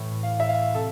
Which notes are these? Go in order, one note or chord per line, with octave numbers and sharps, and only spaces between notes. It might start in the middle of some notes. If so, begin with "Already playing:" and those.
Already playing: A2 E3
F5
E5
F5
C3 A4